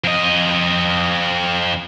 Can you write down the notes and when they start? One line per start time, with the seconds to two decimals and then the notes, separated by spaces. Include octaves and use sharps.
0.04 F2 D#5